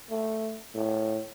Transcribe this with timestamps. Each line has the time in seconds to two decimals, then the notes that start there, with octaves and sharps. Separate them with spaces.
0.10 A3
0.75 A2